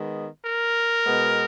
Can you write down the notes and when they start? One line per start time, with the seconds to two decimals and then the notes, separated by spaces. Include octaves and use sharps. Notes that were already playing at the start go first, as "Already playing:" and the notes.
Already playing: D#3 G#3 B3
0.45 A#4
1.05 B2 G#3 B3